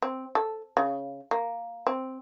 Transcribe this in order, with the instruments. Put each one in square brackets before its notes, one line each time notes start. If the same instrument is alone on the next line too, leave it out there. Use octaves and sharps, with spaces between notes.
[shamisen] C4
A4
C#3
A#3
C4